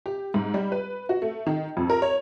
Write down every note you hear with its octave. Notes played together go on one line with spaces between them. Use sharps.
G4
G#2
G3
B4
F#4
A3
D#3
F2
A#4
C#5